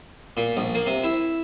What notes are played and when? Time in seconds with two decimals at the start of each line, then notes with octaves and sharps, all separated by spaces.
0.37 A#2
0.57 A#1
0.75 A#3
0.86 C3
1.04 E4